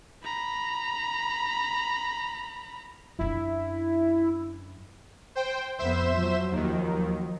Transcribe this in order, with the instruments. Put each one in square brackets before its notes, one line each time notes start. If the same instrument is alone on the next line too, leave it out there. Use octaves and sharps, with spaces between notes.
[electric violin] A#5 B5
[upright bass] F#2 D4 [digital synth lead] E4
[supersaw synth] C5 G5
[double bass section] F2 B3 [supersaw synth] C5 E5 E7
[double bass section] F3 F#3
[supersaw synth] D#2 D#3